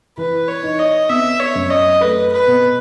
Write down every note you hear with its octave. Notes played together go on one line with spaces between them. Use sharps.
E3 B4
C#5
D#4
D#5
B3 E5
C#5
F#2
D#5
A3 B4
B4
B2